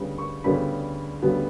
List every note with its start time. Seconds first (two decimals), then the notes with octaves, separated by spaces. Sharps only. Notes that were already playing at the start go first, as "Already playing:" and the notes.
Already playing: D2 C#3 G3 B3
0.18 C#6
0.44 D2 C#3 G3 B3 B5
1.22 D2 C#3 G3 B3